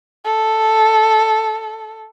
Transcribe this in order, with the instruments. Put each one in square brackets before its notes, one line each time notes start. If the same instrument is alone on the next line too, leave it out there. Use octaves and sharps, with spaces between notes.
[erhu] A4